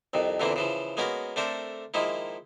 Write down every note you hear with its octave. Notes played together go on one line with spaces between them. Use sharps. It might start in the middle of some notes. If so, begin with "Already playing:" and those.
C2 F2 D#3
E2 A#2 D3 E3 A#3 C4
C#3 E3 F3
G#3 A#3 B3 C#4 F#4 A#4
A3 C4 D4 A4 A#4 C5
D#3 F3 G#3 A#3 E4